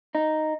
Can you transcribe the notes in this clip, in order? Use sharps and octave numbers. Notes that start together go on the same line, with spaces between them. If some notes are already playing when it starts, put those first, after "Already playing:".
D#4